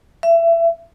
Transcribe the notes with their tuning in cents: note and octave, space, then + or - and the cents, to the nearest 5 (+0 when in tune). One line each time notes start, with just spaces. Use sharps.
E5 +25